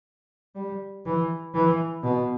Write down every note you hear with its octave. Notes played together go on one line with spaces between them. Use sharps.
G3
E3
E3
B2